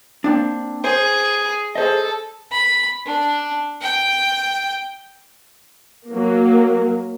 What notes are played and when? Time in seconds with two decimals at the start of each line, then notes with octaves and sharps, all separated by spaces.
0.24 A#3 C4 D4
0.84 G#4 C5
1.75 G#4 A4 C5 D#5
2.52 B5
3.06 D4
3.82 G5
6.12 F#3 A#3